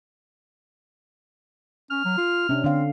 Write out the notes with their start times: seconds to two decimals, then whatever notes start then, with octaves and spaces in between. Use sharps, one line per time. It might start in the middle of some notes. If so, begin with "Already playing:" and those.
1.91 C#4 F6
2.05 F#3
2.17 F4
2.49 C3 C#4 D4
2.64 D3 C4 F5